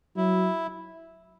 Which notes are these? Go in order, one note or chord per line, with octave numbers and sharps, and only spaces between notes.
F#3 E4